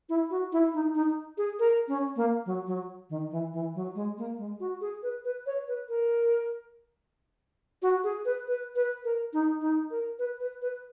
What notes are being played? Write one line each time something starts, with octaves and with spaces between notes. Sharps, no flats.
E4
F#4
E4
D#4
D#4
G#4
A#4
C#4
A#3
F#3
F#3
D#3
E3
E3
F#3
G#3
A#3
G#3
F#4
G#4
B4
B4
C#5
B4
A#4
F#4
G#4
B4
B4
B4
A#4
D#4
D#4
A#4
B4
B4
B4